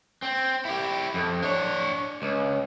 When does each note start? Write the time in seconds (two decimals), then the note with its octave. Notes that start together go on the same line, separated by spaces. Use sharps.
0.22 C4
0.65 E4 G4
1.14 F2
1.42 D4 C#5
2.22 C#2